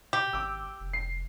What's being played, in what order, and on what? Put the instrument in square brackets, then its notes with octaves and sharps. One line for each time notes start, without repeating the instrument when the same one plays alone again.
[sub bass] B2 [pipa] G4
[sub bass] G#1 [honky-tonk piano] D6 E6
[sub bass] F1
[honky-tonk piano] C7